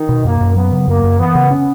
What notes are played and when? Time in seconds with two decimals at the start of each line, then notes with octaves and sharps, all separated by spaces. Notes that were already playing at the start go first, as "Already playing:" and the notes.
Already playing: D#3
0.09 B2
0.25 F#2 A#3
0.41 F#2
0.56 F#3 B3
0.72 C#3
0.88 F#2 A#3
1.03 F#2
1.19 E3 B3
1.35 C#3
1.51 C#4